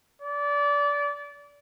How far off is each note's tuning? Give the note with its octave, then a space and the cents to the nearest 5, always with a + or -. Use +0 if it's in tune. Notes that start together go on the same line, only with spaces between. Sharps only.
D5 -25